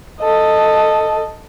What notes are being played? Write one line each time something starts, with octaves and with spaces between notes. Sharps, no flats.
A4 D#5